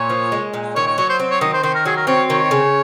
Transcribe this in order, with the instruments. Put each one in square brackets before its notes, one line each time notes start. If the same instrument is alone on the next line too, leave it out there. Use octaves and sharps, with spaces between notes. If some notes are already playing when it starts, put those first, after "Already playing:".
Already playing: [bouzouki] A#2 [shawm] C#5
[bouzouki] F3
G#3
A#2
[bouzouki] D#3 [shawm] C#5
[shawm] C#5
[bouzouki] F#3 [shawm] C#5
[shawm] C5
[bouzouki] C4
[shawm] C#5
[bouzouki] D#3 [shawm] D#5
[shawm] C5
[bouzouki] D#3 [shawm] C5
[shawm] A#4
[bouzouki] F#3 [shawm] G#4
[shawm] A#4
[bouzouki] C4 [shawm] C#5
[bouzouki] D#3 [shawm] C#5
[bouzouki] C#3